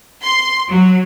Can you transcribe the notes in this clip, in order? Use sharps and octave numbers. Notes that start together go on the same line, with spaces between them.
C6
F#3